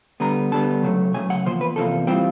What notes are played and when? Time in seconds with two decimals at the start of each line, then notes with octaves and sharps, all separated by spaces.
0.20 D3 G3 B3 A#5
0.52 D3 G3 B3 A5
0.83 C#3 F#3 A3
1.14 C#3 F#3 A3 G#5
1.30 F#5
1.45 E2 C3 F3 A#3 C5
1.61 B4
1.76 E2 C3 F3 A#3 A4
2.07 E3 G3 C4 F4 G4